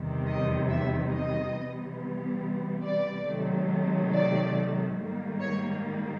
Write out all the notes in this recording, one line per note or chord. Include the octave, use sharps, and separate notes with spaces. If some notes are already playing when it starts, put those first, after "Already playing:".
Already playing: E2 C3 D#3 G3
D#5
E5
D#5
C3 E3 G3 B3
D5
C3 D#3 F#3 A3
D5
G#2 D#3 G3 A#3
C#5